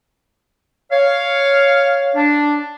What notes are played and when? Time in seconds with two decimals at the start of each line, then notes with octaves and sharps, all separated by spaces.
0.92 C#5 F5
2.16 D4